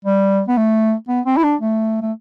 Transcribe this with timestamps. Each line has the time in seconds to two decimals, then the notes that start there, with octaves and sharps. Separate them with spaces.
0.05 G3
0.48 B3
0.57 A3
1.08 B3
1.26 C4
1.37 E4
1.43 D4
1.61 A3
2.02 A3